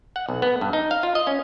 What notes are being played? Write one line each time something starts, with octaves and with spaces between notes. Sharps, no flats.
F#5
B1
B3
G2
D#4
F5
F4
D#5
C#4